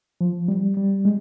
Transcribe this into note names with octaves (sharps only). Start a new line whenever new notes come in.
F3
G3
G3
G#3